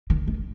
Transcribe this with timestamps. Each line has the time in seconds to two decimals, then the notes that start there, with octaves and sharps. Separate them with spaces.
0.10 D#3
0.28 D#3